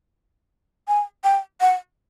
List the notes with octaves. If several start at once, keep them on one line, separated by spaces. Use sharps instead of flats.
G#5
G5
F#5